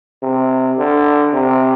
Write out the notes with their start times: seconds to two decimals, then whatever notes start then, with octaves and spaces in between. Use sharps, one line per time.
0.23 C3
0.78 D3
1.33 C3